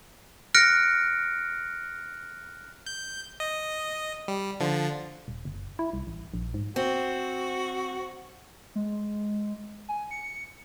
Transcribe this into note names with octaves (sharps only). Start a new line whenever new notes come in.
F6 F#6 A#6 C#7 D7
G6
D#5
G3
D3 F3
D#1
F#1
E4
C2
A1
A#1
G#2
C4 F#4
G#3
G#5
C#7